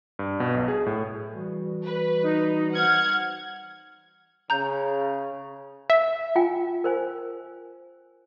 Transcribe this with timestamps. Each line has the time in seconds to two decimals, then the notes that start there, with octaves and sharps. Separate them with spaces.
0.19 G2
0.40 B2
0.55 B1
0.68 G#4
0.86 A2
1.34 E3 G3 F#4
1.84 B4
2.24 D#4
2.74 C5 F#5 F6 G#6
4.50 C#3 A#5 G6
5.90 E5
6.36 F4 G5 G#5
6.84 A#4 C5 G#5